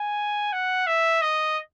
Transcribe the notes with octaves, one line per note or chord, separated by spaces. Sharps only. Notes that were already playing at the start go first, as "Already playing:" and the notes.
Already playing: G#5
F#5
E5
D#5